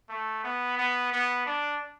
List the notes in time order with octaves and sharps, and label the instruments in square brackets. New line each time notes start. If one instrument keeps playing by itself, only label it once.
[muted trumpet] A3
B3
B3
B3
D4